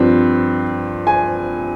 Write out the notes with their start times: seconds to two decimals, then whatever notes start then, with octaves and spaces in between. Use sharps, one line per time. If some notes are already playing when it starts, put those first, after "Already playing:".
Already playing: G2 F3 C4
1.07 G#5